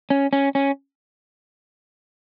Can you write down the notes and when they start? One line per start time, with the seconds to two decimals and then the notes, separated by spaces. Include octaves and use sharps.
0.10 C#4
0.33 C#4
0.55 C#4